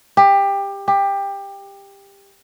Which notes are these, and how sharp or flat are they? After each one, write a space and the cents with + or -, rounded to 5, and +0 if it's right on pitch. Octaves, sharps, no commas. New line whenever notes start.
G4 +20
G4 +20